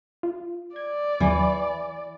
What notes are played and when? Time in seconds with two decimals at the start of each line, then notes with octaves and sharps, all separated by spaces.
0.23 F4
0.76 D5 G#6
1.20 D#2 E3 F#3